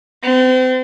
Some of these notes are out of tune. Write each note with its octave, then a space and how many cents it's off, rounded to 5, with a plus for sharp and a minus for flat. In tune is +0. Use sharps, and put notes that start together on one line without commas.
C4 -35